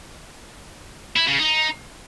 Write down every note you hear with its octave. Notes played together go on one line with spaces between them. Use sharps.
E4
C#3
D#4